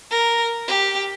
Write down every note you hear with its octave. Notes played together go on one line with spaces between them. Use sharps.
A#4
G4